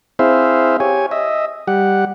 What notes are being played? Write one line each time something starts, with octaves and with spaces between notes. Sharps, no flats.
C4 E4 G#4 C5 E5 F5
G4 C#5 G#5
D#5 E5
G3 G4 F#5